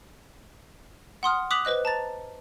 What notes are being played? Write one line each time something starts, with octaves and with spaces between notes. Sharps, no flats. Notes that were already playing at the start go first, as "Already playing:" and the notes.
F#5 C6 D#6 F6
D6 D#6 F#6 B6 F7 F#7
B4 C5 D#5 F#6
A5 A#5 A6